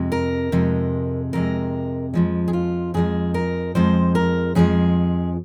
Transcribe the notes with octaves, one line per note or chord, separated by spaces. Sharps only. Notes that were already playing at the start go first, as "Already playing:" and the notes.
Already playing: F2 C3 G#3
A#4
F2 C3 G#3
F2 C3 G#3 A#4
F2 F3 G#3
G#4
F4
F2 F3 G#3 G#4
A#4
F2 F3 G#3 C5
A#4
F2 F3 G#3 G#4